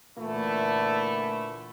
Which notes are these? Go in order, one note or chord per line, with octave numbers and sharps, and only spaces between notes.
A#2 D3 E3 A3 E4